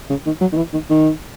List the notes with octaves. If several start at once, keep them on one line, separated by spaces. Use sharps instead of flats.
C#3
D#3
F#3
D#3
E3
D#3
D#3